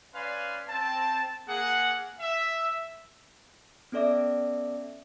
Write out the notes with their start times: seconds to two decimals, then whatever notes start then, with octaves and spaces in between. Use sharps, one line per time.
0.14 C#4 B4 D5 F5 G#5 C6
0.69 C4 A5
1.48 A#3 G#4 F#5
2.20 E5
3.92 B3 C#4 A4 D5 E5 D6